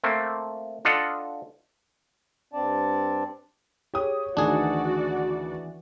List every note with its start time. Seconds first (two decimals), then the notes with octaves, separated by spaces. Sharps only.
0.04 A3 A#3 C4
0.85 D4 F4 A4 D#5 F#5
2.53 G2 C4 D4 D5 A5
3.94 G4 G#4 C#5 D#6
4.37 D2 D#3 E3 D4 F#4 G#4 D5